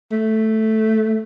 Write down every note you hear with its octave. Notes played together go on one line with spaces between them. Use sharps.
A3